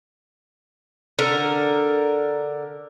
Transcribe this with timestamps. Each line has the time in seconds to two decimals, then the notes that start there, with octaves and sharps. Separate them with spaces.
1.19 D3 A#4